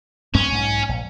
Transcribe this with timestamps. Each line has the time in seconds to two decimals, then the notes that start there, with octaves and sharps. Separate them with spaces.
0.35 G2 G#3 C4 C#4
0.50 B1 G#2
0.89 A#1